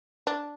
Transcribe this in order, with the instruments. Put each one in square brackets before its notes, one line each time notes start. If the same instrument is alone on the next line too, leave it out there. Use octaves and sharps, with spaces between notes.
[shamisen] D4